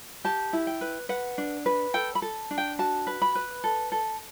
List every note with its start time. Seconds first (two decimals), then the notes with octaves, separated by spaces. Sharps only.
0.24 G4 A5
0.53 E4
0.67 G5
0.81 B4
1.09 B4 F#5
1.38 D4
1.66 B4
1.94 A4 G5
2.15 B5
2.22 A4
2.51 D4
2.58 G5
2.79 F#4 A5
3.07 B4
3.22 B5
3.35 B4
3.64 A4
3.92 A4